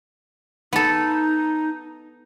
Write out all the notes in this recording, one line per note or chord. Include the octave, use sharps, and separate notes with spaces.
B3 D#4 A4